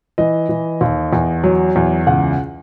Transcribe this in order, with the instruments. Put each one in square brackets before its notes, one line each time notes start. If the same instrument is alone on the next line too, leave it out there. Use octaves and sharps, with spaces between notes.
[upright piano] E3 D#5
E3
D#2
E2
F#3
E2
C#2 F#5